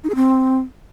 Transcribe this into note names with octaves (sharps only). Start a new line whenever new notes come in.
D#4
G#4
C4